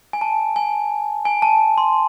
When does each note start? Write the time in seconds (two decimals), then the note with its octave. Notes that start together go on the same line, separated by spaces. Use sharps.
0.13 G#5
0.21 A5
0.56 G#5
1.25 G#5
1.42 A5
1.78 C6